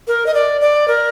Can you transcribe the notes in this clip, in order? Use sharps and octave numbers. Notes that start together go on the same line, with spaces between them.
A#4
D#5
D5
D5
A#4